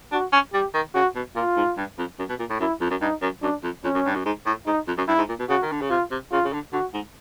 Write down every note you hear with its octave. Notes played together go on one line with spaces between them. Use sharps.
D4 F#4
C#4
G3 G4
D#3
C#3 F#4
B2
A#2 F4
G#2
G2
F2
F#2
B2
A#2
A2
F#2 E4
F2
F#2
G2 D#4
F#2
F#2 D4
F2
F2 C#4
F#2
G2
F#2
G#2
A2
G#2 D#4
F2
F#2
G2 E4
G#2
A#2
B2
C#3 F#4
D#3
D3
C#3
C3 F4
C3
C#3 F4
C#3
D3
D3 F#4
G#2